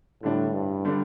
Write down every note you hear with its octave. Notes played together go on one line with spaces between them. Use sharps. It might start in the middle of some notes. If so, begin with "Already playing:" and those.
A2 D3 G3 D4
G2
D3 G3 D4